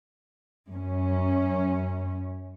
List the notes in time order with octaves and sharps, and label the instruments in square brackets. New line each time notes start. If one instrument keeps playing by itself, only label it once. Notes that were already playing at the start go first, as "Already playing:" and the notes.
[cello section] F#2 C#4